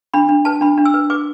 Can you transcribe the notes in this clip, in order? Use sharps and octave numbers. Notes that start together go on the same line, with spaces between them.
D4 B5
D4
B4 A5
D4 B5
D4
E6
B4
B4 D6